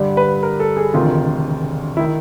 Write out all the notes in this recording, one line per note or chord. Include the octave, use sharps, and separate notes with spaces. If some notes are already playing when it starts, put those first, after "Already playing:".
Already playing: G2 D3 G3
B4
A#4
A4
G#4
E1 D2 C3 D#3 F4
D#3 E4